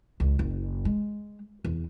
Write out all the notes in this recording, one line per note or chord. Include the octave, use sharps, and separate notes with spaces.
C#2
F#1
G#3
E2